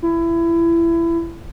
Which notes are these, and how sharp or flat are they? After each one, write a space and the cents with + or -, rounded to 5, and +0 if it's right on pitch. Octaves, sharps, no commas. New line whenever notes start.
E4 +25